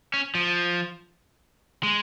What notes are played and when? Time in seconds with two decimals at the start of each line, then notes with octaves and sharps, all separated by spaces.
0.14 C#4
0.35 F3
1.83 G#3